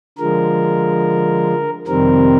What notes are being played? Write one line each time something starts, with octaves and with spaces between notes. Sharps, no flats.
D3 F3 G#3 A#4
F2 C3 D#3 G3 C4 A#4